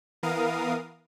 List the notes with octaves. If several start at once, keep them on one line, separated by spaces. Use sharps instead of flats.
E3 B3 A#4 F5 D#6